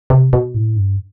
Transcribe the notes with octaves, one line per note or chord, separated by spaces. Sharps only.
C3
B2
A2
G2